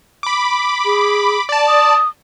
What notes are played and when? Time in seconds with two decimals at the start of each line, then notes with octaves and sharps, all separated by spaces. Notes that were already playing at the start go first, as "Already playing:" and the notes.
0.23 B5 D6
0.85 G#4
1.49 D5 A5
1.67 D#6